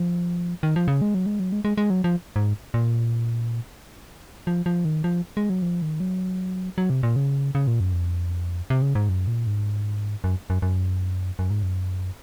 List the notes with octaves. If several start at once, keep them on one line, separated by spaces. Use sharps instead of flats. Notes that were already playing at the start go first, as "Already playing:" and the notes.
Already playing: F3
D#3
F3
C#3
G#3
F#3
G#3
F#3
G#3
G#3
G#3
F#3
F3
G#2
A#2
F3
F3
D#3
F3
G#3
F#3
F3
D#3
F#3
F#3
C3
A#2
C#3
C#3
A#2
F#2
F2
C3
C#3
G#2
F#2
A#2
G#2
F#2
F#2
F#2
F#2
G#2
F#2